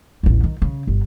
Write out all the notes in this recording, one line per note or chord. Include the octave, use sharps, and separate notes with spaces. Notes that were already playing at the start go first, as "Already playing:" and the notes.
A1 D#2
D#3
C#3
G1